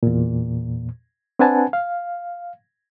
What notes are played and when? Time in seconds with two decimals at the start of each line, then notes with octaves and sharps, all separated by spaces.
0.03 E2 A#2
1.39 C4 D4 B4 F#5 G#5 A5
1.73 F5